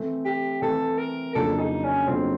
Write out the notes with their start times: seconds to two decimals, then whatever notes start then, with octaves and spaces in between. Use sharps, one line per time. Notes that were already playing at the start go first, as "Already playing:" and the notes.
Already playing: E3 A3 C4
0.25 G4
0.62 E3 A3 C4 A4
0.98 A#4
1.35 F2 C#3 F#3 A#3 D4 A4
1.59 D#4
1.84 C#4
2.07 F2 C#3 F#3 A#3 C4 D4